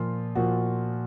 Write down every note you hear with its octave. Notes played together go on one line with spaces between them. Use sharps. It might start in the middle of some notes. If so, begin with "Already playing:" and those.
Already playing: A#2 F3 F4
A#2 F3 F#4